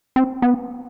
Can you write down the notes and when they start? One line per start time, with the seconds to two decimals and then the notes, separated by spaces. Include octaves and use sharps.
0.16 C4
0.42 B3